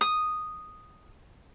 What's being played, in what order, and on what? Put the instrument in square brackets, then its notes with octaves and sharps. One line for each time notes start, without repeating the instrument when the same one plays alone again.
[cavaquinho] D#6